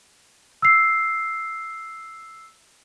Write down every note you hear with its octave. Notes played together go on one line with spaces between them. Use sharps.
E6 C7